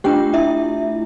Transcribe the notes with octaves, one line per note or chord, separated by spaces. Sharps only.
A3 D4 F4 G4 G5
E4 E5